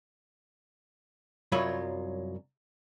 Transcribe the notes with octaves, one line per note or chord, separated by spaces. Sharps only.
C2 F#2 F#3 F4 C#5 B5